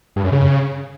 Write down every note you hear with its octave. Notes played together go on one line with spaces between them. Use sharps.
G2
F#2
C#3